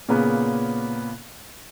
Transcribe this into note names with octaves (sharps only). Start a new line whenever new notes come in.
A#2 C#3 A#3 B3